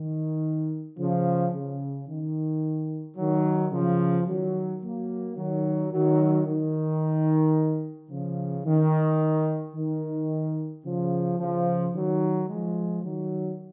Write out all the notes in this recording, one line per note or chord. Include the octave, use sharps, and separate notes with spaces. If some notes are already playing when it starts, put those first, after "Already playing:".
Already playing: D#3
C#3 F3
C#3
D#3
D#3 F#3
C#3 F3
D#3 F#3
F#3 A#3
D#3 F#3
D#3 F#3
D#3
C#3 F3
D#3
D#3
C#3 F3
C#3 F3
D#3 F#3
F3 G#3
D#3 F#3